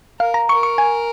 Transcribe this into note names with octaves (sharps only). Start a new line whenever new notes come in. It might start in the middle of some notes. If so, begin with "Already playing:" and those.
A#4 F5
A#5
A#4 C#6
C#6
G#5